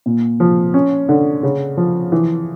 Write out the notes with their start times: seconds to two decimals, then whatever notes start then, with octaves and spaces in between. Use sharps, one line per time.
0.06 A#2
0.40 F3
0.74 C#4
1.09 D3
1.43 C#3
1.77 F3
2.12 E3